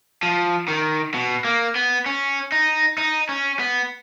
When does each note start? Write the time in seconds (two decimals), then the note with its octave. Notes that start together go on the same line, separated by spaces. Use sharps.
0.23 F3
0.68 D#3
1.14 B2
1.45 A#3
1.76 B3
2.06 C#4
2.52 D#4
2.98 D#4
3.29 C#4
3.60 B3